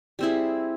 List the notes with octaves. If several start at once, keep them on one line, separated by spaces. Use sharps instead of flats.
G3 C4 E4 G#4